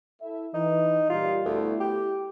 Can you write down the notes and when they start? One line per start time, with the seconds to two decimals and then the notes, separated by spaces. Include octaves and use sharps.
0.21 E4 A4 E5
0.54 E3 D#4
1.09 A#2 G3 F4
1.45 D2 A3 B3 E4
1.80 G4